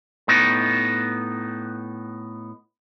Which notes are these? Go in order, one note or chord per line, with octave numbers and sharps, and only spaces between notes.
A2 B3 D#4